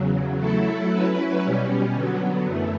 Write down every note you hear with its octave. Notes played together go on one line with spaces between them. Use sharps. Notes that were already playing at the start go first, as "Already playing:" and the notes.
Already playing: E2 C#3 F#3
F#3 A3 E4 A4
F#3 C#4 E4 B4
B2 G3 C#4
D3 F#3 B3
F#2 E3 A3